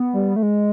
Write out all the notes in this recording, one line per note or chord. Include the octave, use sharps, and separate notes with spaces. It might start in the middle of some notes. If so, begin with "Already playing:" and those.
Already playing: B3
G3
A3
G#3